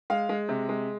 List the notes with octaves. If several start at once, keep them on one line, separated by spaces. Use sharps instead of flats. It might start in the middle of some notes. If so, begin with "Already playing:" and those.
G#3 F5
G#3
C3
G#3